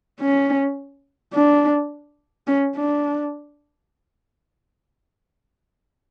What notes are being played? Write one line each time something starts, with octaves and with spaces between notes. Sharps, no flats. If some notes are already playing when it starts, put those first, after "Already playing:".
C#4
D4
C#4
D4